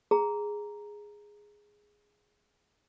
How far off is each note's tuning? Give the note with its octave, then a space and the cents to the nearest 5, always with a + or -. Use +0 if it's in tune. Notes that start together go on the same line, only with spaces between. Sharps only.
G#4 +0 A#5 +0